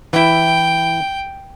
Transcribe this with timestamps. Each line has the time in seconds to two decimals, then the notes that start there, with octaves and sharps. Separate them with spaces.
0.13 E3 E4 G5